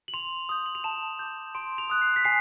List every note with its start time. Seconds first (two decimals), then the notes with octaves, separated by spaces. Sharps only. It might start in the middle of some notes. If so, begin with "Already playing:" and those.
0.08 F#7
0.14 C6 F7
0.49 D#6 G6
0.66 F#7
0.75 F7
0.84 A5 E7
1.19 D6 G6
1.55 C6 D7
1.78 F7
1.90 D#6 F#6
2.02 C7
2.16 B6
2.25 G#5 C7